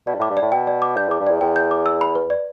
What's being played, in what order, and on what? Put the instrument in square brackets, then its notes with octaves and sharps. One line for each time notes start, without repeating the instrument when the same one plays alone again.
[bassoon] B2 [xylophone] D5
[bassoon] G2
[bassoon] A2 [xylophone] D6
[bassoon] G2
[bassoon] A2 [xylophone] D5
[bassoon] B2 [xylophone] G5
[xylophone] D5
D6
[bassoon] G2 [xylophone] G6
[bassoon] E2 [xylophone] D6
[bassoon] G2
[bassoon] E2 [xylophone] D5
[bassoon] E2 [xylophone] G5
[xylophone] G6
D6
E6
B5
B4
D5